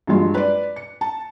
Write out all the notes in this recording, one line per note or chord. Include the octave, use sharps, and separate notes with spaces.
G2 F#3 G#3 F4
B4 D5
C#7
A5